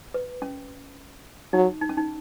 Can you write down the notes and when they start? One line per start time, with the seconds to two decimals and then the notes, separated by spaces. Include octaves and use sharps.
0.14 B4
0.42 C#4
1.53 F#3 D#4
1.81 D#4
1.89 C#4
1.97 D#4